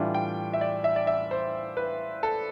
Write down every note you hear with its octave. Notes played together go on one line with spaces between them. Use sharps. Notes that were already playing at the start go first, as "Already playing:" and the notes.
Already playing: A2 E3 G3 D4 F4
G5
E5
D5
E5
D5
E5
C5
B4
A4